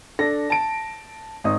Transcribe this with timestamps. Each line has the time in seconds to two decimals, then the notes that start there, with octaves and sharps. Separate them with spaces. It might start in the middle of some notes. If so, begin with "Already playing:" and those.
0.19 D4 A4 A#6
0.50 A5 D7
1.44 G#1 D#5 D#6